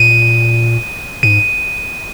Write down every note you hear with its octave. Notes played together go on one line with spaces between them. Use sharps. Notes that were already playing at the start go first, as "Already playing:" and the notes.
Already playing: A#2 D#7
G#2 D#7